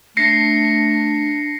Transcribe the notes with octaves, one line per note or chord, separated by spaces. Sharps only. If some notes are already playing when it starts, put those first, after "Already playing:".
A3 D4 A#6 C7 C#7